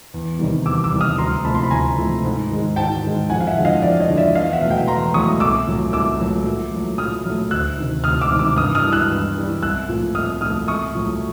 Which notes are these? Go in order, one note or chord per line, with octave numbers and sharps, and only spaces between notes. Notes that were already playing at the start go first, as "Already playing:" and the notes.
E2
C3 D#3 G3
E2 D6 E6
D6 E6
C3 D#3 G3
D#6 F6
D2 A#5 C6
C3 F3 A3 A5 B5
C6
B5
D2 G#5 A#5
C3 F3 A3
G#2
D#3 G#3
G#2 G5 A5
D#3 G#3
F2 F#5 G#5
F5
E5 F#5
D3 F3 G#3
D#5 F5
F2 D5 E5
C#5 D#5
D3 F3 G#3
D5 E5
E2 D#5 F5
E5 F#5
B2 F#3 A3
F5 G5
E2 A#5 C6
B2 F#3 A3 C#6 D#6
C2 D6 E6
A#2 F#3 A3
C2 D6 E6
A#2 F#3 A3
A#2
F#3 A3
A#2 D#6 F6
F#3 A3
D2 E6 F#6
C3 D#3
D2 D#6 F6
D6 E6
C3 D#3
D6 E6
G2 D#6 F6
D#6 F6
E3 G3
E6 F#6
G2
E3 G3
C2 E6 F#6
A#2 F3 A3
C2 D#6 F6
A#2 F3 A3 D#6 F6
C2 C#6 D#6
A#2 F#3 A3